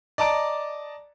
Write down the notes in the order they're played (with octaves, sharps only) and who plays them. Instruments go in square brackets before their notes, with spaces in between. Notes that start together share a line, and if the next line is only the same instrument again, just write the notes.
[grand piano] D5 D#5 A5 A#5 D6 D7